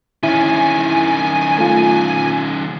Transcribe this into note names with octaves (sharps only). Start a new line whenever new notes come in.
D#3 C#4 E4 G#5
A3 F4